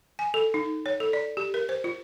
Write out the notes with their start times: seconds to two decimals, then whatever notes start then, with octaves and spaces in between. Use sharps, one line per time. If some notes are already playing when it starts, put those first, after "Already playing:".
0.19 G#5
0.34 A4
0.54 D#4
0.86 C#5
1.00 A4
1.13 D5
1.37 G4
1.54 A#4
1.69 C5
1.84 F4